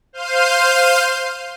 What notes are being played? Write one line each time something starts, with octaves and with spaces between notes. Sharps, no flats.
C5 F5 F6 G6 C7 D#7